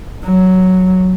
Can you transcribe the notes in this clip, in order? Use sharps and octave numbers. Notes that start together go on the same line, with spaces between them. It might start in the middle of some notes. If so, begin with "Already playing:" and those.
F#3